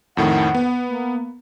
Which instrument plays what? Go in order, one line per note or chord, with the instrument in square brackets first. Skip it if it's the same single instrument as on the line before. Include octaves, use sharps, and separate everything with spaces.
[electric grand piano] F2 A2 D#3 [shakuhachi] F#5
[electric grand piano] B3
[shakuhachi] A#3